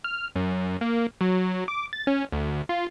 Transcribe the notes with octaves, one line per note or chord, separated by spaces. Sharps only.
F6
F#2
A#3
F#3
D6
A6
C#4
D2
F4